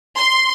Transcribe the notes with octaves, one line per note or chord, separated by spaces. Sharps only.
C6